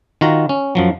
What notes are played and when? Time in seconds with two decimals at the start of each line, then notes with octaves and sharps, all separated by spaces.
0.21 D#3 F4 F#4 A#5
0.49 C#4
0.75 F#2 F3 F#3